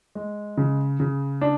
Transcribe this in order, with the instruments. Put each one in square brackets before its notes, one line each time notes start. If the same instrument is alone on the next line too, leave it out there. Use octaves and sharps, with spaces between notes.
[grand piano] G#3
C#3
C#3
D4